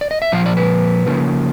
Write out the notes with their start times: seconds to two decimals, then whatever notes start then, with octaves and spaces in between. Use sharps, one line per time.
0.01 D5
0.11 D#5
0.22 E5
0.32 A#2 F3 F5
0.46 D5
0.57 B4
1.07 C#3 F3 A#3